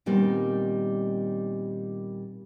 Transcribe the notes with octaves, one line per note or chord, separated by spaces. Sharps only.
A#2 D#3 G3 B3 C4